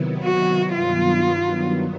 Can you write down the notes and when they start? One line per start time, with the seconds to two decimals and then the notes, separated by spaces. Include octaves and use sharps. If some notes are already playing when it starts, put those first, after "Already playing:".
Already playing: C3 D#3 F#3 B3 E4
0.23 F#4
0.75 G2 D#3 F#3 B3 F4